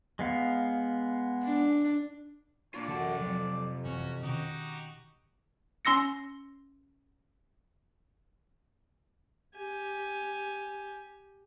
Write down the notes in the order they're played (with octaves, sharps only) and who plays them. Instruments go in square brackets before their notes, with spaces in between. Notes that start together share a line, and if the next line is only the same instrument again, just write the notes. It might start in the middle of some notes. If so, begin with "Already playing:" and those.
[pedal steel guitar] G#3 B3 F5
[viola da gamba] D4
[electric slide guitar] A#3 F4 [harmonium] D4 [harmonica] D5
[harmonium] F#2 F#4 [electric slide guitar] C3 A4 A5 [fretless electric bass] E3
[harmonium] F2 [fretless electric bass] F3 F#3
[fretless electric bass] F#1 E3 C4 [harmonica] C#4 F#4
[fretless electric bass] B2 D#3 C#4 [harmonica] D#4 F#4 G4
[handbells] C#4 C6 E6 A#6 C#7
[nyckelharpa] G4 G#5